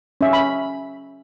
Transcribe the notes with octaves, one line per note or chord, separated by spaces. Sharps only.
C#4 E5
B5